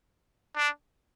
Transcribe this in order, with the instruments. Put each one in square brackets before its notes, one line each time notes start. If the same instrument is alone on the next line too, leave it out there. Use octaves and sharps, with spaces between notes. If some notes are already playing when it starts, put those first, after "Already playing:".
[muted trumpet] D4